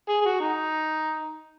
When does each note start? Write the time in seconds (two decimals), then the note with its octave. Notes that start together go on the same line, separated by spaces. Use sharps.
0.09 G#4
0.21 G#4
0.25 F#4
0.40 D#4